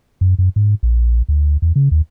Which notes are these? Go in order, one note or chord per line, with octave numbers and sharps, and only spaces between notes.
F#2
F#2
G#2
A#1
D2
E2
C#3
D#2